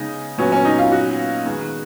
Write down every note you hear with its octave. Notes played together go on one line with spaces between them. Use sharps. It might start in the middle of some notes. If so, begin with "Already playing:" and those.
Already playing: C#3 G#3 B3 D#4
A#2 F#3 B3 C#4
C#4
D#4
F4
F#4
D#3 G#3 B3